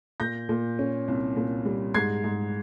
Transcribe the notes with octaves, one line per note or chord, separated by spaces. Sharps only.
A#2 G6 A#6
A#2
C#4
C2
A#2
G3
G#2 G#6 C7
G#2